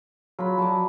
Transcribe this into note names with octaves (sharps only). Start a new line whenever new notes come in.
F#3 F4 B5
F#3 D5 A5